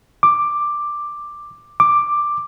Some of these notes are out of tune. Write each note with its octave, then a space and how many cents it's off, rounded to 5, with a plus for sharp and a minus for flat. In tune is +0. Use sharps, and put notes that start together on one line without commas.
D6 +5
D6 +5